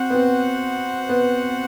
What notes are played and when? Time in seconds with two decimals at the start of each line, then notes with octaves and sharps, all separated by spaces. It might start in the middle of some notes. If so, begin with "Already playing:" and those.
Already playing: C4 F#4 C5 F#5
0.10 B3
0.14 C4
1.09 B3